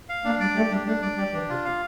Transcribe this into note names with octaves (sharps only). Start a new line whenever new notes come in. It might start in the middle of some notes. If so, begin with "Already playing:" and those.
F5
A#3 D4
G3 D5
A3 G4
G3 D4
A3 D4
G3 D5
G3 G4
E3 D4
C3 F4
C3 F5